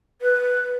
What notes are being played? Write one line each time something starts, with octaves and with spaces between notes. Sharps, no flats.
B4